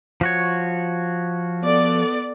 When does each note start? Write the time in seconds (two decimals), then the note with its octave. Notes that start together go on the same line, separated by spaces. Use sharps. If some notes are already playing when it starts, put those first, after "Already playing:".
0.21 F3 F#4 C#5
1.63 B3 A4 D5